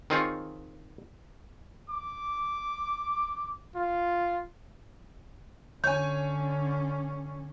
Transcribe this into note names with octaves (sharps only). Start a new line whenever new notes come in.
D#3 C4 D#4 F4 G#4 C#5
D6
F4
D3 C#4 C#5 G#5 G6